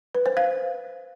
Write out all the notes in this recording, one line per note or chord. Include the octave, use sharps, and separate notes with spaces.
B4
C5
F5